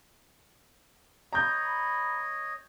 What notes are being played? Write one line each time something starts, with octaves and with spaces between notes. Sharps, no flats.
C#5 D#5 A#5 B5 G6